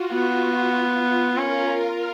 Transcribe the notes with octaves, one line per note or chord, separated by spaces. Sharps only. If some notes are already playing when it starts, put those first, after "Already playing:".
Already playing: F4 F#4
B3
C#4 A#4
A#4